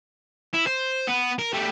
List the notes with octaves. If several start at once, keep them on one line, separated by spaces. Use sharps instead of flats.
E4
C5
B3
A#4
G3 A3